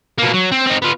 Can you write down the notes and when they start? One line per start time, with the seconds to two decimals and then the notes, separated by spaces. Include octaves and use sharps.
0.18 B2 A#3
0.33 F#3
0.52 C4
0.67 C4 D#4
0.82 B3 F4